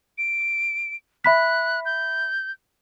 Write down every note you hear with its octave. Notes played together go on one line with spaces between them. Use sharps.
D7
E5 B5 F#6 B6
G6